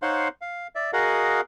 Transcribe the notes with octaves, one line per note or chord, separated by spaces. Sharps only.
D#4 C5 C#5 F5 F#5 C6
F5
D5 E5
F#4 G#4 A#4 D#5 F5 F#5